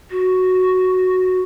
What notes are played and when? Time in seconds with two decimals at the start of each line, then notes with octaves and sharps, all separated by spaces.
0.11 F#4